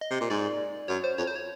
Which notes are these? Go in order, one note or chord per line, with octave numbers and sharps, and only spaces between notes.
D#5
C3
A#2
G#2 D5
F#2 C#5
C5
F2 C#5
C5
C#5